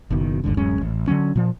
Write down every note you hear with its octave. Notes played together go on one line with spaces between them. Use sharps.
F#1 B2 D#3
G1 D#2 G#2 D3
D1 F#2 G#3 C#4
A1
D3 E3 F#3 C#4
A#2 F3